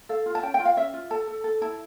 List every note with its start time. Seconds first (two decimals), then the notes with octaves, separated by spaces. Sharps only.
0.09 A4 F5
0.26 F4
0.35 A5
0.43 C#4 G5
0.54 G5
0.59 F4
0.65 F5
0.77 C#4 E5
0.94 F4
1.10 A4 A5
1.28 A4
1.44 A4
1.61 E4 A5